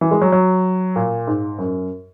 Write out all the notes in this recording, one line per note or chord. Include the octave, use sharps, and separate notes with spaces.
E3
G#3
F#3
F#3
A#2
G#2
F#2